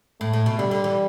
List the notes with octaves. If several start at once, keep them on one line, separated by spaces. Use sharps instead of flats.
A2 A3
A2
B2
D3 G3
D3
E3